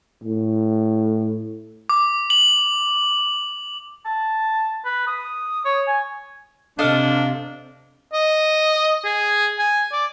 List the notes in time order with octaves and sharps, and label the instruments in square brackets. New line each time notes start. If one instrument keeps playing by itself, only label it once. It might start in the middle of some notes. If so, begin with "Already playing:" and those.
[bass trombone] A2
[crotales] D6
F#7
[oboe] A5
B4
D#6
C#5
G#5
[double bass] C3 [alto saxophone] D4 [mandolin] A4 D#5 F5
[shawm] D#5
G#4
G#5
D5